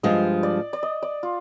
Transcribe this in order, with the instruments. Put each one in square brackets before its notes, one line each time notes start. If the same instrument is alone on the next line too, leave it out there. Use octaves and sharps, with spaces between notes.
[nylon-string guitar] G2 F3 G#3 [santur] D#5
[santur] D5
D5
D#5
D5
F4